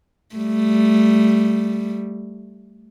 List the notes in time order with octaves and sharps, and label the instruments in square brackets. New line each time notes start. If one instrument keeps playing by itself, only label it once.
[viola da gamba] G3 A3